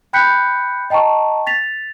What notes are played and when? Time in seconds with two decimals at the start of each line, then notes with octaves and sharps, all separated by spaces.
0.13 G5 B5 F#6 G6 B6 C#7
0.90 D#5 G5 A5 A#5 C#6
1.47 A6 B6 F7